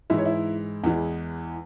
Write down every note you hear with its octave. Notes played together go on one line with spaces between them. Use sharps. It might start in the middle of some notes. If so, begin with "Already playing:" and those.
G#2 E3 G#3 E5
C#5
E4 E5
E2 E3 G#3